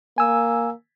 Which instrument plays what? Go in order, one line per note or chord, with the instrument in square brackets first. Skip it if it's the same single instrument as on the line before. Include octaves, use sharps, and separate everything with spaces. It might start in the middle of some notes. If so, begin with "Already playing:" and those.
[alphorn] A#3 [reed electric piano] G#5 E6